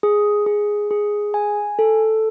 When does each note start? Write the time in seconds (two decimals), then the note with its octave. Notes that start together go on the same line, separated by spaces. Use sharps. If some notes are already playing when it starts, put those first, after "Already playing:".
0.03 G#4
0.46 G#4
0.91 G#4
1.34 G#5
1.79 A4